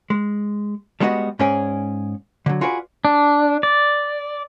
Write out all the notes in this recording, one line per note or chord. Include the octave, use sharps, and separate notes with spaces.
G#3
G3 G#3 B3 F#4 B4 D#5
G#2 C#4 G#4 D5
D3 F#3
F4 F#4 G#4 B4 D5
D4
D5